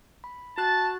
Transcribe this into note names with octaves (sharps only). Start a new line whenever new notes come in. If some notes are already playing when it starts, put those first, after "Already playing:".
B5
F#4 A5 F#6 A6